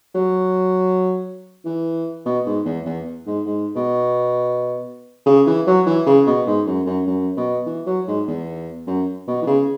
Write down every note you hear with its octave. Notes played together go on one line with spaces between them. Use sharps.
F#3
E3
B2
G#2
E2
E2
G#2
G#2
B2
C#3
E3
F#3
E3
C#3
B2
G#2
F#2
F#2
F#2
B2
E3
F#3
G#2
E2
F#2
B2
E3
C#3